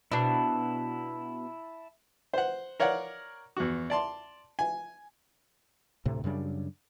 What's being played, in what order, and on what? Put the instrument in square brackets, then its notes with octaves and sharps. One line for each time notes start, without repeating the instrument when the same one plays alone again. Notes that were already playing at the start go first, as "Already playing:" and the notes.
[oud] B2 D4 [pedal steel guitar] E4 A5
[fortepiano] C5 F#5
A#4 C#5 D5 F5 F#5
E2 F#4
D5 A5 C6
G#5
[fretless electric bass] D2 A2 C3
F#2 C#3 G3 D4